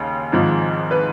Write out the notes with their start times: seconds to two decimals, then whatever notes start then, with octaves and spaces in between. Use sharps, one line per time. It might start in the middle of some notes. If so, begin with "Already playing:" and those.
Already playing: D#2 C#3
0.32 G#1 G#2 F3
0.91 B4